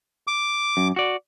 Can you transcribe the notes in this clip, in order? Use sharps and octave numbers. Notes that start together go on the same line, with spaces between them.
D6
F#2
F#4 D5